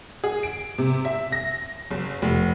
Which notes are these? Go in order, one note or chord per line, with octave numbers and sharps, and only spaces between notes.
G#4
D7
C3
E5
A#6
F#1
F1